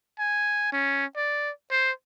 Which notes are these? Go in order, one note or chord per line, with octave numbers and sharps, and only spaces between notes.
G#5
C#4
D5
C5